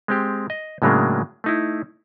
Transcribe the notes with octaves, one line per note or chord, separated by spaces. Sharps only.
G#3 C4 G4
D#5
A2 C#3 F#3 G#3 A#3 D4
A3 D#4 E4